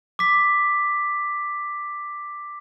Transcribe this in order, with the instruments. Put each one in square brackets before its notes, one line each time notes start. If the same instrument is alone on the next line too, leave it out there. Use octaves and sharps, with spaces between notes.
[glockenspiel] D6 B6